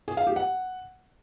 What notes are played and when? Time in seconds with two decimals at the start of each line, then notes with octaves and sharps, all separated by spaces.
0.08 G#4
0.17 F5
0.27 G4
0.36 F#5